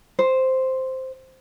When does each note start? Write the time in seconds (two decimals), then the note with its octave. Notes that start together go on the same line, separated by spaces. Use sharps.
0.19 C5